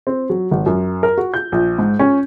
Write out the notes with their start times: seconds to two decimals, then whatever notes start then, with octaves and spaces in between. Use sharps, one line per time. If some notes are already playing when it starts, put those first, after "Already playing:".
0.07 C4
0.30 F#3
0.51 G#1
0.66 F#2
1.03 A#4
1.18 F#4
1.34 G6
1.52 A#1
1.79 G#2
1.99 C#4